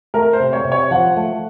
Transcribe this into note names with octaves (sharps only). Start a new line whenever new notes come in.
A3 A#4
C5
C3
C#5
C3
C#5
F3 F#5
A3